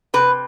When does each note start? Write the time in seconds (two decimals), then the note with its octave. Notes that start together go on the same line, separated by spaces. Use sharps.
0.14 C3 B4